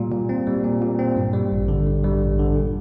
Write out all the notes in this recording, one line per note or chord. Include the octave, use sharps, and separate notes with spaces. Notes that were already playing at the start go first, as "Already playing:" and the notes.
Already playing: A#2 G3
A#2
C4
G3
A#2
A#2
C4
G2
G3
A1
D3
G2
G3
A1
D3
A#2